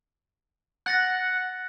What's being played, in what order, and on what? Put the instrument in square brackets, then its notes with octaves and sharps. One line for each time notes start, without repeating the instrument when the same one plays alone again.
[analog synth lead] F#5 [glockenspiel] F#6 A6 A#6